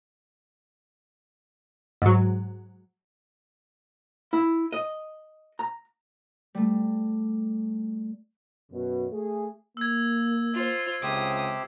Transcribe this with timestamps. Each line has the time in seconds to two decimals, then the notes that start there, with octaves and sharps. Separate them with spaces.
2.02 G#2 F#3
4.33 E4
4.73 D#5
5.59 A#5
6.55 G3 A3
8.71 F#2 B2
9.11 A3 G#4
9.77 A#3 E6 G#6
10.54 F4 C5
11.02 C#2 C3 G4 C5 D#6